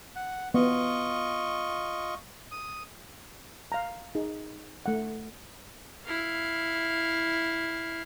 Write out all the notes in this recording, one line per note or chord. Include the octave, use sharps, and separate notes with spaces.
F#5
B3 F4 D#5 C#6
D#6
F5 A#5
D#4 G#4
A3 F#5
E4 F5